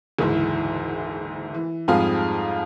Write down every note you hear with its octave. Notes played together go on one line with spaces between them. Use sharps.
F#1 D2 G#2 E3
E3
F2 G#2 F3 G3 G#4 F5